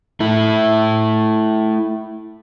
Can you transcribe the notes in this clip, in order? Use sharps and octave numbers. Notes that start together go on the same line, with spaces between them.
A3 E4